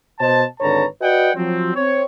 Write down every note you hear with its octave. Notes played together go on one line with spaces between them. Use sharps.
B2 C5 D#5 A5
G#1 D3 B4 C#5 A5 A#5
F#4 B4 D5 D#5 F#5 G5
F3 F#3 C4
C4 C#5